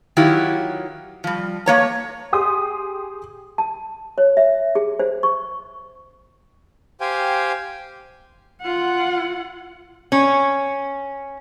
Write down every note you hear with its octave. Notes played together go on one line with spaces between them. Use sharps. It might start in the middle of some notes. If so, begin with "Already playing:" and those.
D#3 F#3 E4 F4 G4
F3 G3
A3 A#3 C#5 A#5
G4 G#4 C6 D#6
A5
C#5
E5
G#4
C5
C#6
G4 C5 F5 G5 G#5
F4 F#5
C#4